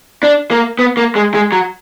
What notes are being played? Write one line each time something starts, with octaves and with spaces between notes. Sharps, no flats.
D4
A#3
B3
A#3
G#3
G#3
F#3